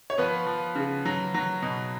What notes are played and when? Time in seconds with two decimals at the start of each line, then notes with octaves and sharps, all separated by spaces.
0.10 C#5
0.18 F3 B3 B4
0.47 F3
0.75 C#3
1.06 F#3
1.34 F#3
1.62 B2